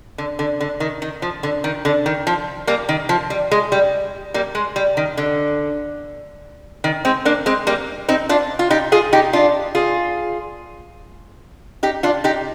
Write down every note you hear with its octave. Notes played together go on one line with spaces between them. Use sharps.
D3
D3
D3
D#3
D#3
F3
D3
D#3
D3
D#3
F3
G3 A#3
D#3
F3
G3
G#3
G3
G3 A#3
G#3
G3
D#3
D3
D#3
G#3 C4
A#3 D4
G#3 C4
G3 A#3
C4 D#4
D4 F4
F4
D#4 G4
F4 G#4
D#4 G4
D4 F4
F4 G#4
D#4 G4
D4 F4
D#4 G4